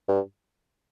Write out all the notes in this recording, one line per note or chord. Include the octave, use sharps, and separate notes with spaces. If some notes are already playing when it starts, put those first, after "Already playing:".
G2